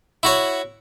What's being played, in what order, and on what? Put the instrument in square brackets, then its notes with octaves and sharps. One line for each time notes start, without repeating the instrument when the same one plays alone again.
[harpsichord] E4 F#4 C#5